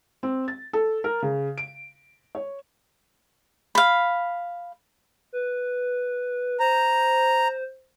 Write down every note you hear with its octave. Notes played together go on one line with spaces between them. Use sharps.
C4
A6
A4
A#4
C#3
D7
C#5
F5 B5
B4
C5 A#5